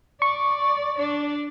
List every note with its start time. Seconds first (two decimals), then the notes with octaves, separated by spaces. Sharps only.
0.22 D5 C#6
0.98 D4 D5